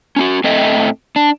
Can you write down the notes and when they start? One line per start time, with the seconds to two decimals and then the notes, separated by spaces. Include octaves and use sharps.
0.16 C#4 D#4 F#4
0.44 A2 C4 A4 D#5 E5 G5
1.16 D4